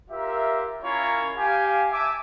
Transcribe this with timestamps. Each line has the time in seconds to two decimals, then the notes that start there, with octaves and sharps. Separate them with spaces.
0.10 F4 G4 A#4 E5
0.83 C#4 E4 F4 A#4 C#5 A#5
1.36 G4 F5 G#5
1.91 E5 G#5 A5 D6